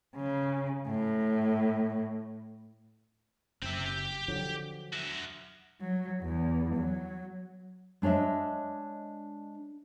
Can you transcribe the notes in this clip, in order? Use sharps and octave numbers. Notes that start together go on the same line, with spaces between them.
C#3
A2
F#1 C4 E5
G4
D3 F3 F#3
F#4 E5
F#3
E2
F#3
G#3 D4 C#5 D#5 E5